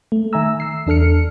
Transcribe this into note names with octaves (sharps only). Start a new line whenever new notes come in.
A3
D#3 E5 G#5 A#5 E6
E6 C7
E2 D4 A4 F6 C#7